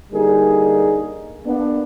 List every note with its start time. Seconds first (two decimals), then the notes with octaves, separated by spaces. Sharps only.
0.11 D3 G3 A#3 D#4 G#4 A#4
1.45 A#3 B3 D4